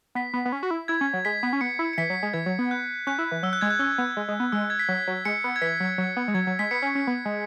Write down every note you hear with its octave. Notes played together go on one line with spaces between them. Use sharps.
B3 B6
B3
B3
C#4
F#4
E4
E4 G#6
C#4
F#3
G#3 B6
B3
C#4
B3 C#7
E4
C#7
E3 B6
F#3
G#3
E3 G#6
F#3
B3
F#6
C#4 F#6
E4
E3
F#3 E6
F#6
G#3 G#6
F#6
C#4 E6
B3
G#3
G#3
B3
G#3 E6
G#6
B6
F#3
F#3
G#3 C#7
B3
G#6
E3 B6
F#3
F#3
B3
G#3
F#3 G#6
F#3
G#3 B6
B3 C#7
C#4
C#4
B3
G#3